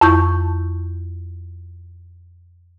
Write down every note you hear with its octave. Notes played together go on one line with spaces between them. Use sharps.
F2 E4 C#6 G6